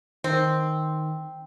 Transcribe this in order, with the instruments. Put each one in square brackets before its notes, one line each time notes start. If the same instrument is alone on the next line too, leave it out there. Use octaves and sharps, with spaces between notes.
[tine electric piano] D#3 D#4 [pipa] C4